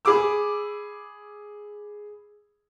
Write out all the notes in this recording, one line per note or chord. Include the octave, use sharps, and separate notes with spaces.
G#4 B5 D6 E6